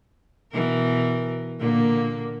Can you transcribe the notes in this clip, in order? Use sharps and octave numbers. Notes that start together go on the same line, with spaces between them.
B2 E3 A#4
A#2 D3 A#3